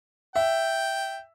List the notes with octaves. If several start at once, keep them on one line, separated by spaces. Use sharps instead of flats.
E5 G5